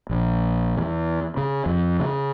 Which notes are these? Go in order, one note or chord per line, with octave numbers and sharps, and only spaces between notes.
A#1
E2
C#3
F2
C#3